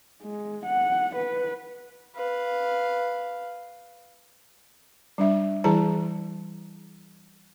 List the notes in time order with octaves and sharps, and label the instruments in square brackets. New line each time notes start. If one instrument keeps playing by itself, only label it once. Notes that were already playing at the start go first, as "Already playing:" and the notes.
[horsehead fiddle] G#3
F#5
B4
[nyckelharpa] B4 F5
[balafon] G3 D4 E5
E3 G3 E4 G#4 A5 A#5